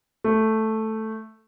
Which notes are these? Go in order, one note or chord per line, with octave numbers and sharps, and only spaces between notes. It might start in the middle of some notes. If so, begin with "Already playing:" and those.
A3